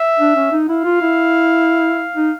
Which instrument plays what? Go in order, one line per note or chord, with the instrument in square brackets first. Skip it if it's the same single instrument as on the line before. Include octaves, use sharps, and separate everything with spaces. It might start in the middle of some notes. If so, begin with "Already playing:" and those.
Already playing: [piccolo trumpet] E5
[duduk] D4
C#4
D#4
[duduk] E4 [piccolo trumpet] F5
[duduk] F4
E4
D#4